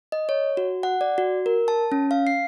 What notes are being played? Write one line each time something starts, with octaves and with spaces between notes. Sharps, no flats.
D#5
C#5
F#4
F#5
D5
F#4
A#4
A5
C#4
F5
C7